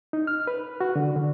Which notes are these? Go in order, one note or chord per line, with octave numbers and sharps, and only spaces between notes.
D#4
F6
B4
F#4
D3
D3